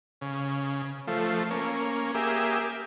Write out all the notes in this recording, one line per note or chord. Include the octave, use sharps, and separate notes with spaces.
C#3
F3 A3
A#3 C#4
A#3 G4 G#4 E5